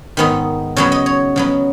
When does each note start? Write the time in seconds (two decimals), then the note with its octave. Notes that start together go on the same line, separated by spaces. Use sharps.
0.17 G#2 D#3 B3 D#4
0.76 C#3 F#3 B3 C#5
0.92 D#5
1.06 C#5
1.36 C#3 F#3 B3